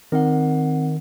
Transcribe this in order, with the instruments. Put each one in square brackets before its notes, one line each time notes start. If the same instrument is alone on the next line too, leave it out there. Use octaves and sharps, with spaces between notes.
[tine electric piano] D#3 [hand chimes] C4 F#5